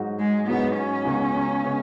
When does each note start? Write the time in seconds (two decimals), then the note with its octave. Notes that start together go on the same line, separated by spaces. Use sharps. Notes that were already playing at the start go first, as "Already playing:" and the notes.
Already playing: G#2 F#3 D#4 F#4
0.20 G#3
0.47 G#2 F#3 B3 D#4 F#4
0.77 C#4
1.05 C#2 C#3 G#3 B3
1.64 C#3 G#3 B3